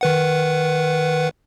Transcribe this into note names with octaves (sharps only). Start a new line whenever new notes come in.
D#3 B4 F#5